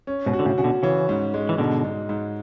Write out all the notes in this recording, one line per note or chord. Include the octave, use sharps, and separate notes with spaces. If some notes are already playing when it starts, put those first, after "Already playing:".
C#4
G#2 B2
F#4
D3
A2 C#3
C#3 F#4
B2 D3
C#3 E3 C#4
G#2
G#3
E3
G#2 B2 D3
G#3
G#2